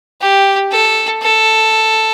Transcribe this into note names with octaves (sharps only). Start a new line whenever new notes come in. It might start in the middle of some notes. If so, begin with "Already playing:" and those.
G4
A4
A4